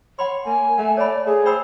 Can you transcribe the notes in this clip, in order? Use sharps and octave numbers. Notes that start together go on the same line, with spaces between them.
C#5 F#5 B5 C6
A#3 G#5
A3 F#5
C#5 D5 B5
A3 G#4
C5 G5 B5 E6